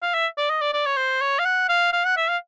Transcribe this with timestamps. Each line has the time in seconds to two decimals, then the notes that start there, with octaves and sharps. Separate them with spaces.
0.02 F5
0.14 E5
0.38 D5
0.49 D#5
0.61 D5
0.73 D5
0.86 C#5
0.97 C5
1.21 C#5
1.39 F5
1.45 F#5
1.69 F5
1.93 F5
2.05 F#5
2.17 E5
2.29 F5